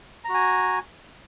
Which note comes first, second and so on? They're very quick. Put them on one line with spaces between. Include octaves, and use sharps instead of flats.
A#5 F#4 G#5